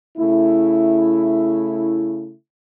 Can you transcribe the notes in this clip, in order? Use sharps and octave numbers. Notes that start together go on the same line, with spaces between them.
C#3 A3 E4